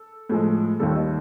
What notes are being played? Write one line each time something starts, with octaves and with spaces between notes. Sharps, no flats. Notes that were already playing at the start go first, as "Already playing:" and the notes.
Already playing: A4
A2 F3 G#3
D#2 D#3 G3 A4
D#5